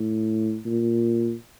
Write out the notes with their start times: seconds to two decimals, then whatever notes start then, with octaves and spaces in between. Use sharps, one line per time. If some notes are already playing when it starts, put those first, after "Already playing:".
Already playing: A2
0.65 A#2